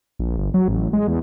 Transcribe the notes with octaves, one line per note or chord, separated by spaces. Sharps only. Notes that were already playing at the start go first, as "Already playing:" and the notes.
A#1
G1
F#3
A1
G#3
E2